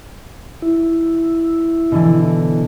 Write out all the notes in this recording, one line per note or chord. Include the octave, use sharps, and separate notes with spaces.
E4
B2 D3 E3